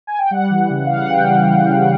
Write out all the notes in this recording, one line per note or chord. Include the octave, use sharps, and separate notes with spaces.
G#5
G5
G3 F#5
E3
C#3
G3 F5
F#5
E3 G5
G3
E3
C#3